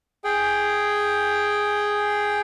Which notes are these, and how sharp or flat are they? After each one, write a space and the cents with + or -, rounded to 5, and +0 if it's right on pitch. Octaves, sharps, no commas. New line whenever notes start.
G#4 +0 G5 +0